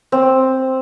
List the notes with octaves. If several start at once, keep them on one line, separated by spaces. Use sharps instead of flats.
C4